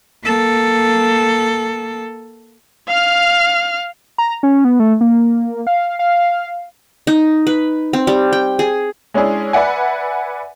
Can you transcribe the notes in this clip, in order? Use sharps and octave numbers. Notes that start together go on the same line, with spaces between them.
A#3 A4
F5 F6
A#5
C#4
B3
A3
A#3
F5
F5
D#4
B4
C4
G3
G5
G#4
G#3 C#4 D4 E4 G#4
B4 D5 E5 F#5 G#5